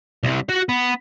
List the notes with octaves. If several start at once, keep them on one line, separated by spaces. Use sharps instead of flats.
C2 C3
F#4 F#5
B3